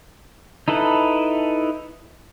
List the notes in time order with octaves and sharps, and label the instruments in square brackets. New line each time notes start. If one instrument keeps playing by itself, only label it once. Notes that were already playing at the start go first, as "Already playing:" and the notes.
[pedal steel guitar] D#4 E4 A4 B4